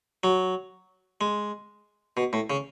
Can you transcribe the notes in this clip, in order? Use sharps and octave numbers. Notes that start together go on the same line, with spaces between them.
F#3
G#3
B2
A2
C#3